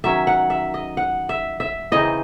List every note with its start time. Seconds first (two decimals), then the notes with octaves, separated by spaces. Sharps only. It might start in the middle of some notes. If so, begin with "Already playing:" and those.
0.04 D#3 F#3 C#4 E5
0.27 F#5
0.50 E5
0.74 D#5
0.97 F#5
1.29 E5
1.60 E5
1.92 C#3 E3 C4 D#4 D#5